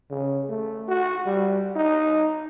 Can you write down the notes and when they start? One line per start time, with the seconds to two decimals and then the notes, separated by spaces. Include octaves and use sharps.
0.11 C#3
0.49 A3
0.88 F#4
1.26 G3
1.76 D#4